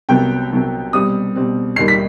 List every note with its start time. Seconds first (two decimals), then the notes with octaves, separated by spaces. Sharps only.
0.09 C2 C3 F#3 B3 G5
0.51 C2 C3 F#3 B3
0.93 B2 G3 C4 D#6
1.36 B2 G3 C4
1.76 D#2 D#3 G3 D#4 C7
1.88 B6